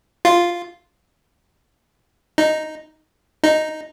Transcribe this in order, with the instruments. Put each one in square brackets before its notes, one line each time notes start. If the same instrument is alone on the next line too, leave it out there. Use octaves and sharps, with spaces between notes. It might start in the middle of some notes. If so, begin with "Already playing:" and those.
[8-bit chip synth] F4
D#4
D#4